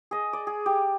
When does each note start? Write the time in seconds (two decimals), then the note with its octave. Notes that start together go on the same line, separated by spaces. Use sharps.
0.11 G#4 D#5
0.33 D5
0.47 G#4
0.66 G4